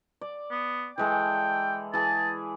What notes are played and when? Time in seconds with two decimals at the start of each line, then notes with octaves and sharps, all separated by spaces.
0.21 D5
0.51 B3
0.98 E3 G#3 A4 G5
1.94 E3 G#4 A5